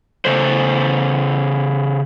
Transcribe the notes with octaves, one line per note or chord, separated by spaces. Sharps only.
C#3 A4 C5